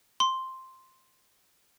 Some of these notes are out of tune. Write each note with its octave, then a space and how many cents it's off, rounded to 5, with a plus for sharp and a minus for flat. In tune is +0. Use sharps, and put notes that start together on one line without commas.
C6 +0